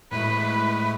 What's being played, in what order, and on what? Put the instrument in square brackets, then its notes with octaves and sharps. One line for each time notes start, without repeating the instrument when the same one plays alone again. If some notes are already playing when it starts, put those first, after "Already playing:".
[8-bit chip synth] A2 G#3 A3 [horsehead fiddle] B4